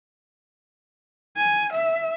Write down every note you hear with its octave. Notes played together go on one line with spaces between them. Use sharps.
G#5
E5